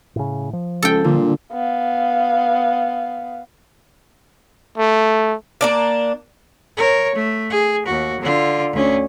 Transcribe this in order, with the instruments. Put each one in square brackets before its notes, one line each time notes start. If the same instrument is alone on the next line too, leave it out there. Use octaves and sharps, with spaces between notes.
[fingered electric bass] A2 C#3
F3
[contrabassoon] C#2 [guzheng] A4 G5
[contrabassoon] A#2 [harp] D3 G3
[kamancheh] B3 F5
[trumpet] A3
[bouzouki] A#3 D4 D5
[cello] A#4 C#5
A3
G#4
D#2 F#4
D3 F4
D2 C#4